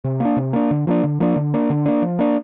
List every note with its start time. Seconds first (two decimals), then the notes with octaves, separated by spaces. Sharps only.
0.04 C3
0.20 A#3
0.25 D4
0.37 C3
0.53 A#3 D4
0.71 D3
0.87 F3 A#3 D4
1.04 D3
1.20 F3 A#3 D4
1.36 D3
1.54 A#3 D4
1.70 D3
1.86 A#3 D4
2.02 F3
2.19 A#3 D4